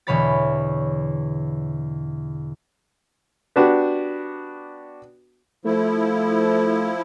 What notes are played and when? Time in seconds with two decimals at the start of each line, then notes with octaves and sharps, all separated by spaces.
0.07 E2 B2 D3 C#5 B5 A6
3.56 B3 D4 F#4 G4
5.65 F3 A3 E4